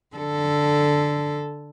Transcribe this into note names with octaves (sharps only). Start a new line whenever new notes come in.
D3 A4